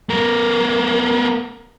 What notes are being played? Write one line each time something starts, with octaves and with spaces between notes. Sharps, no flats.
B3 A#4